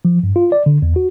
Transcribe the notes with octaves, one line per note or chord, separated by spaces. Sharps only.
F3
G2
F4
D5
D3
E2
F#4